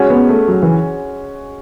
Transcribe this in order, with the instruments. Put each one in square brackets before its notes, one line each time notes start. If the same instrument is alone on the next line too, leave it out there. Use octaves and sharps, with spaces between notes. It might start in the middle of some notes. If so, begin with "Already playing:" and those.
Already playing: [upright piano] G#3 C#4 F#4
[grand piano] B3
A3
F#3
E3